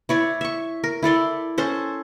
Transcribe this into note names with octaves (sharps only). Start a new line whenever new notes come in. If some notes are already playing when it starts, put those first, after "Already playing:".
E4 C#5 D5
E5 C#6
A#4
E4 A4 D5 C6
C#4 A4 C5